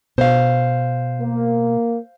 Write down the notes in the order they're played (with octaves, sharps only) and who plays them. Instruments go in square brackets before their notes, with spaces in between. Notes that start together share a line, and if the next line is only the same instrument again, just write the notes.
[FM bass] B2 [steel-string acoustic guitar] C5 F5
[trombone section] A#3